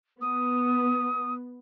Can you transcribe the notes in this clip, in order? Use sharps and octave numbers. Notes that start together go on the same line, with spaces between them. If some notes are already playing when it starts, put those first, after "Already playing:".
B3 D#6